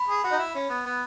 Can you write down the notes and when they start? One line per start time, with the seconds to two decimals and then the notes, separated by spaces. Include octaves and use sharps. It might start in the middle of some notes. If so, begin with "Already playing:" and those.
Already playing: B5
0.08 G#4
0.24 F#4
0.32 D#4
0.38 E4
0.55 C#4
0.69 B3
0.86 B3